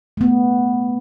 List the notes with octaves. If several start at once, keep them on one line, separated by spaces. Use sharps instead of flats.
A3 B3